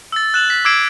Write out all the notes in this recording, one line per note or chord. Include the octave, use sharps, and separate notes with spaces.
E6 A6
F#6 E7 F#7
B6
D6 E6 G#6 C7 D7 E7